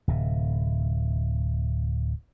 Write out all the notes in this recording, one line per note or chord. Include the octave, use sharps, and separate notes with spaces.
D1 C3